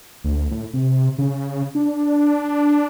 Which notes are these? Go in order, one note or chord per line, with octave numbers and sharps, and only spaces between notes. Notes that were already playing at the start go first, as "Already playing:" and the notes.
D2
A2
C3
C#3
D4